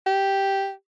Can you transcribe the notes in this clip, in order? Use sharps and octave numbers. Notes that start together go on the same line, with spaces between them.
G4